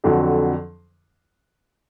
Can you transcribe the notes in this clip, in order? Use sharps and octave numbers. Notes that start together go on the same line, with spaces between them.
F2 D3 F#3